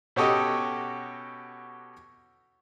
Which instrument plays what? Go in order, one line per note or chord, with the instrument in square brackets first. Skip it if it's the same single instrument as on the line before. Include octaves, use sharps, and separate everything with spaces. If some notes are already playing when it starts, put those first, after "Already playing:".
[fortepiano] B2 C#4 F#4 G4 A4 D#5